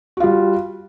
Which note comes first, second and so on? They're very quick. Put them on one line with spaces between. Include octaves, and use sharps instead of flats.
F#4 F4 G3